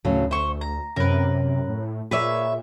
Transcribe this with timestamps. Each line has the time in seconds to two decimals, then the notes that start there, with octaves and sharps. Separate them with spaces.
0.05 D2 A2 C#3 F#3
0.31 C5 E5 C#6
0.61 A#5
0.96 F#2 C3 A#4 B4
1.69 A2
2.11 A#2 G#4 B4 C#5 D5 E5